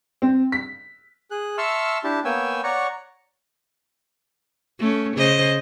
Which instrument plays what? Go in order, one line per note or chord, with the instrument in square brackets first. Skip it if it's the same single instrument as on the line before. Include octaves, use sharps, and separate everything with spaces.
[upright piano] C4
B6
[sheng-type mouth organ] G#4 F#6
E5 A5 C6 C#6 E6 F6
D4 E4 G4 A5
A#3 B3 C#5 G5 G#5 E6
C#5 D5 F#5 A#5 C#6
[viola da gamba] A3 C#4
C#3 C5 D#5